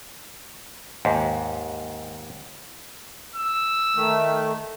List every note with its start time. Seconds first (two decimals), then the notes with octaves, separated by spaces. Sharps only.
1.05 D#2 G#2
3.36 E6
3.96 D#3 A3